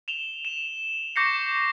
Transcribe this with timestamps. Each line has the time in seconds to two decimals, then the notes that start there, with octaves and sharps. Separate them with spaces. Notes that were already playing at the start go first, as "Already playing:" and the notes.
0.08 E7 F7 G7
0.45 E7
1.16 C#6 D6 G6 A#6 C7 C#7